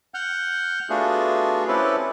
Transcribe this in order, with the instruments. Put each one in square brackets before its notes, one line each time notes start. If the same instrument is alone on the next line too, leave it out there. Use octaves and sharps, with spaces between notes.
[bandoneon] F#5 F6 G6
A3 B3 D4 F4 F#4 G#4
C4 C#4 E4 G4 A4 B4